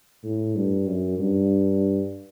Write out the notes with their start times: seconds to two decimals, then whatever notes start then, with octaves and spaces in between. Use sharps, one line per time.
0.24 A2
0.55 G2
0.87 F#2
1.19 G2